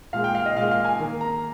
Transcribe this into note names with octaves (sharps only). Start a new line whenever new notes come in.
A#2 G#3 F5
G5
F5
D#5
A#2 G#3 F5
F5
G#5
D#3 A#3
A#5